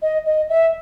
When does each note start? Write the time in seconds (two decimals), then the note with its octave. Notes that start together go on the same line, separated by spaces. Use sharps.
0.02 D#5
0.25 D#5
0.49 E5